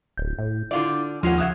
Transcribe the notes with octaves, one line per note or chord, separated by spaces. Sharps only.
D1 G6
A2
D3 E4 F4 D5
D#2 F3 G#3 C#4 F4 F#5
C#3 E5 F#5 D#6 F#6 G#6